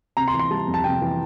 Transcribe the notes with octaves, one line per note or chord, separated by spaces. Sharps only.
C3 A#5
C6
E3
C6
G3 A5
F2
A5
C3 G5
E3